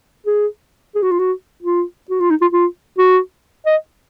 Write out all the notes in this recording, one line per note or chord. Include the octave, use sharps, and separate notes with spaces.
G#4
G#4
F#4
F4
F#4
F4
F#4
F4
D#4
F4
F4
F#4
D#5